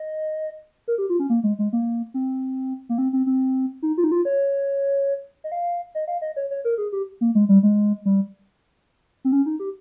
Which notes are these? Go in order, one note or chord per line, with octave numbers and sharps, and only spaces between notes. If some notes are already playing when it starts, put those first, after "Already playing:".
Already playing: D#5
A#4
G4
F4
C#4
A#3
G#3
G#3
A#3
C4
A#3
C4
C4
C4
D#4
F4
D#4
F4
C#5
D#5
F5
D#5
F5
D#5
C#5
C#5
A#4
G#4
G4
A#3
G#3
G3
G#3
G3
C4
C#4
D#4
G4